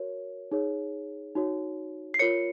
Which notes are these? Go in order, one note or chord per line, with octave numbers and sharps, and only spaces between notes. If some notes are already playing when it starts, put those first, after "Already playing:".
Already playing: F#4 A#4 C#5
D#4 G#4 C#5
D#4 F#4 C#5
C7
F4 A#4 C#5 C#7